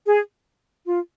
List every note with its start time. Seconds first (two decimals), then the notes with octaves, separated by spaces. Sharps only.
0.05 G#4
0.86 F4